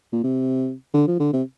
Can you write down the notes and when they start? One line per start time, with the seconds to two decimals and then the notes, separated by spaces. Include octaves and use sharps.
0.12 A#2
0.23 C3
0.94 D3
1.07 F3
1.19 D3
1.33 C3